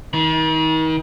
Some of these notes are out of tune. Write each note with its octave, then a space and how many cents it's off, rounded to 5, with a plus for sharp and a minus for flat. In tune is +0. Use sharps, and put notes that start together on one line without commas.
D#3 +35 B5 -45